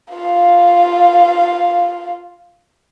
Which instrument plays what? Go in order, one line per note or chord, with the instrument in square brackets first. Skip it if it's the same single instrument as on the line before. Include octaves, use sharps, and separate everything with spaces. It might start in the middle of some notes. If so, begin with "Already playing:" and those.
[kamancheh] F4 F5